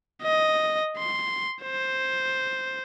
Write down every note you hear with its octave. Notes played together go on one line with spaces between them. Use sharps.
D#5
C6
C5